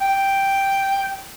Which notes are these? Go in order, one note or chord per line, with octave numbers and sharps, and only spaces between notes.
G5